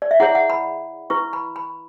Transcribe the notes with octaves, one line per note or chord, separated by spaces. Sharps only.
D5
E5
E4 G#4 C#5 F#5
F#5
B5
E4 B4 C#6
B5
B5